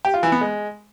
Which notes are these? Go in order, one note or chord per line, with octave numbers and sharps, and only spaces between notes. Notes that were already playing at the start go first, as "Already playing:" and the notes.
G4
F4
E3
B3
G#3